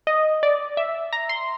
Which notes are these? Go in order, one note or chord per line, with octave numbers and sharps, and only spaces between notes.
D#5
D5
E5
A#5
C6